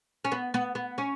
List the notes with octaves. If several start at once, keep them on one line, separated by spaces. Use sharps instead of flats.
C#4
B3
B3
B3
C#4